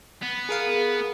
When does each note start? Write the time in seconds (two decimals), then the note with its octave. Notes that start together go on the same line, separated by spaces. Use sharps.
0.23 B3
0.49 G#4 A#4 F5